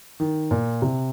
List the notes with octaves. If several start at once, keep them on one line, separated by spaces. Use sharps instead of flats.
D#3
A#2
C3